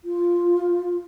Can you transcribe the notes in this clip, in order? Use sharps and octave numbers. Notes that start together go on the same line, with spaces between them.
F4